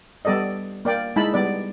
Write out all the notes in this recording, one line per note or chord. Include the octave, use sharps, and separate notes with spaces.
G3 B3 A4 D5 D#5
A#3 D5 G5
G#3 D#4 E4 A5 B5
G3 B3 D5